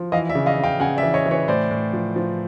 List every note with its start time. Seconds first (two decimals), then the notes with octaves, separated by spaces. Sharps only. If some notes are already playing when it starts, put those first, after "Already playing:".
Already playing: F3
0.12 E3 D#5 F5
0.29 D5 E5
0.35 C#3
0.46 D#5 F5
0.58 C#3
0.63 F5 G5
0.80 C#3 F#5 G#5
0.97 D5 E5
1.03 E3
1.14 C#5 D#5
1.26 E3
1.31 B4 C#5
1.48 A2 C5 D5
1.71 A2
1.93 F3
2.16 F3